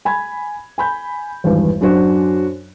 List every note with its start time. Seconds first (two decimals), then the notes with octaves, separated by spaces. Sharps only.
0.05 G#5 B5 G#6
0.78 G#5 B5 G6
1.44 G#1 E2 G2
1.81 F#2 D4 F#4 C5